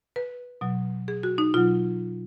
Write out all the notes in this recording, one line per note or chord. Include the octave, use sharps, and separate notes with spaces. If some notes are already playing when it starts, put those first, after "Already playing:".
B4
B2 F#3
G#4
F#4
D#4
B2 F#3 F4